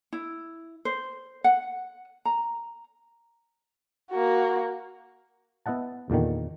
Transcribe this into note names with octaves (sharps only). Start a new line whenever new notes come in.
E4
C5
F#5
A#5
A#3 F#4
B3 E4 D#5 F#5 A5
E2 A#2 D3 D#3